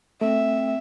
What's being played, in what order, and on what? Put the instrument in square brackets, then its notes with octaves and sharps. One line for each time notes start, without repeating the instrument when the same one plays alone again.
[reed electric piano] A3 [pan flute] C4 [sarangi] E5